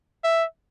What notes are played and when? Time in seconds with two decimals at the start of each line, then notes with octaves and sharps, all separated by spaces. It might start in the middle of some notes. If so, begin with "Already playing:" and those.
0.24 E5